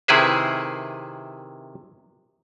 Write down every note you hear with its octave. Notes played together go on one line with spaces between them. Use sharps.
C3 D#3 E4 G#4 B4 C5